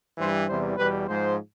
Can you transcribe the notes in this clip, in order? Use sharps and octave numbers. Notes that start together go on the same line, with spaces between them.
G2 E3 G3 C5
E2 C3 E3 G3 C5
E2 B2 G3 B4
G#2 F3 G#3 C5